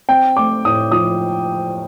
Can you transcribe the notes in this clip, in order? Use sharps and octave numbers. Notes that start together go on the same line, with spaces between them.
C4 G5
A3 D6
A2 D#6
F3 D#6